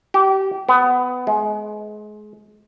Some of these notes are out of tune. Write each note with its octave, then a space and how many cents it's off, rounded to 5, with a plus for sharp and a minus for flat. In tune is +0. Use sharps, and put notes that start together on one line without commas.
G4 -25
B3 +20
G#3 +30